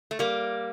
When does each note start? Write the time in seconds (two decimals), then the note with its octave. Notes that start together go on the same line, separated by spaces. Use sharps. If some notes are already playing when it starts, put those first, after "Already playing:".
0.11 A3
0.19 G3 A#3